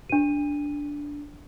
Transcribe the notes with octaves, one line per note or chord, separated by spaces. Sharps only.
D4 D#7